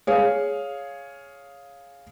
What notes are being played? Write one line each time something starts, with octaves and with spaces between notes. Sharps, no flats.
G#4 C#5 F5